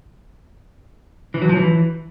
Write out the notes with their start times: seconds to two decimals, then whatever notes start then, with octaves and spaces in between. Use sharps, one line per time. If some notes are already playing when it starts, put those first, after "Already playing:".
1.34 E3
1.42 F#3
1.49 F3
1.57 E3